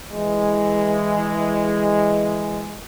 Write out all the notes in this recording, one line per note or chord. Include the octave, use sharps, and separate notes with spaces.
E3 G#3